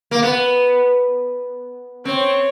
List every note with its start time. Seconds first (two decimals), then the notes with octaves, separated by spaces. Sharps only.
0.11 A#3
0.23 B3
2.05 C4 C#5